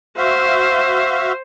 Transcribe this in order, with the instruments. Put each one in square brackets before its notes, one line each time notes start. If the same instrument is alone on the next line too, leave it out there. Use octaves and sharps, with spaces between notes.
[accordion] F#4 E5 F5 [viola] C5